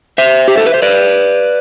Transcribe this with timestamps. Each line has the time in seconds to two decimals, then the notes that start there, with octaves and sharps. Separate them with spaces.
0.18 C5 E5
0.48 G4
0.57 A4
0.66 B4
0.74 C5
0.82 B4 D5